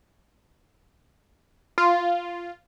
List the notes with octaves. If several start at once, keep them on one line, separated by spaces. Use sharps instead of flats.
F4